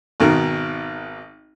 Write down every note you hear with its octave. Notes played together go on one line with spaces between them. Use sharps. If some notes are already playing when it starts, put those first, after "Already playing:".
G#1 B2 D#3 A#4